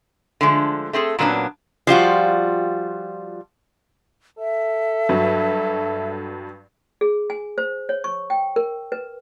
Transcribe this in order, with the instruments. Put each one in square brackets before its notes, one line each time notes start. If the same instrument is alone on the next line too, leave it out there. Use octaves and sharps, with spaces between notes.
[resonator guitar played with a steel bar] D3 F3 G#3 A3
A3 C4 G#4 A4
A#2 F#3 A#3 B3 C#4 D4
F3 G3 F4 F#4
[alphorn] A4 [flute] E5
[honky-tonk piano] G2 F#3
[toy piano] G#4
G#5
C5
C#5
C#6
G5
A#4
B4